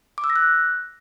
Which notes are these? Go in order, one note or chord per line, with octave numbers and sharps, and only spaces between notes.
D6
E6
A#6
F#6